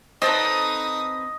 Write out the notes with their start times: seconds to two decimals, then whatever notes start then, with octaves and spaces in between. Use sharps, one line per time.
0.22 C4 D#4 A4 B4 D#5 D#6